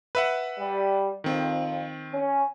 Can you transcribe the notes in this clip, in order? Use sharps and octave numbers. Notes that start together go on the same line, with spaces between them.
B4 E5 F#5
G3
F2 D#3 C4
C#4